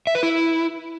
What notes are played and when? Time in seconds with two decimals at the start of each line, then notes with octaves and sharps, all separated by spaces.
0.07 E5
0.15 B4
0.23 E4